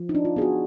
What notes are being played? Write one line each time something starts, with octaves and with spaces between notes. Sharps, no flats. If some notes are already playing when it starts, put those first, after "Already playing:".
Already playing: F3
D#4
D4
F4
B3 G#4
F#4